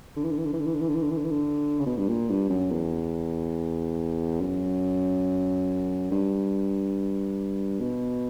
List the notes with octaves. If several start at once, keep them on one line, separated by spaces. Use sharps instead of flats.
D3
E3
D3
E3
D3
E3
D3
E3
D3
E3
D3
E3
D3
E3
D3
E3
D3
C#3
B2
G2
A#2
G2
F#2
E2
F#2
G2
B2